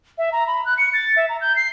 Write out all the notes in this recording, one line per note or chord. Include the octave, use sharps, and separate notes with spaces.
E5
A#5
B5
F#6
C#7
A6
E5
A#5
G6
C7